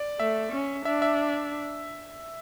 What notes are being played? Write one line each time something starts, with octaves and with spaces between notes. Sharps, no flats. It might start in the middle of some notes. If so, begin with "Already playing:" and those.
Already playing: D5
A3 E5
C#4
D4 E5
E5